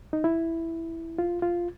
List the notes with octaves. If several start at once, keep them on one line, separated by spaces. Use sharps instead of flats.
D#4
E4
F4
F4